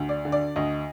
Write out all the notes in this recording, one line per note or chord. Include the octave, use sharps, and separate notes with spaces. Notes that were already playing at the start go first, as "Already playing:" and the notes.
Already playing: D2
D5
D3
D5
D2 D#5